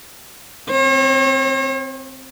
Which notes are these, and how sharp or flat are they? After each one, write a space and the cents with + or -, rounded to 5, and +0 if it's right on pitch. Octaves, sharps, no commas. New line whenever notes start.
C4 +0 C#5 -45